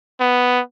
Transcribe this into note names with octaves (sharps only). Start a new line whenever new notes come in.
B3